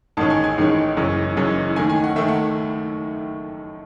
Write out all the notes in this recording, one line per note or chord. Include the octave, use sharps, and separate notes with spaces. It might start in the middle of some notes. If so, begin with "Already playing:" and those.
A1 G#2 D#3 G#3 C#4 A5
G#5
G#5
A1 G#2 D#3 G#3 C#4
F#1 F#2 E3 G#3 C#4
F#1 F#2 E3 G#3 C#4
D#2 D#3 A3 G#5
G#5
F#5
D#2 D#3 A3 E5
F#5